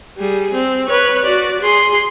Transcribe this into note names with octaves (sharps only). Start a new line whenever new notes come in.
G3 G#4
C4
B4 C#5
F#4 D5
G#4 C6